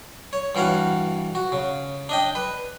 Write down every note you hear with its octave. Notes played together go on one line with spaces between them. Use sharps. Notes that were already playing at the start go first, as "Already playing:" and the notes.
C#5
G2 E3 F#4 F5 F#5
F#4
C#3
D4 D#5 G5
B4